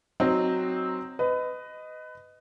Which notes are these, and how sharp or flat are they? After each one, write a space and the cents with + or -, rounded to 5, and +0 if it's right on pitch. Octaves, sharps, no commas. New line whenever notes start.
F#3 +0 C4 +0 D#4 +0
B4 +25 D#5 +0